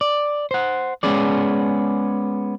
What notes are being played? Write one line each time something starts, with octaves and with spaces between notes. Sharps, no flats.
D5
C5 F#5
G#3 B3 C#4 G#4 D5